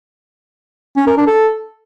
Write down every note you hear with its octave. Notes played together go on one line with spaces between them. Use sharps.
C#4
A#4
D4
A4